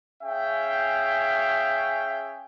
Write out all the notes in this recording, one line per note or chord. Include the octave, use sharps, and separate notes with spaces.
C#4 G#4 E5 F5 G5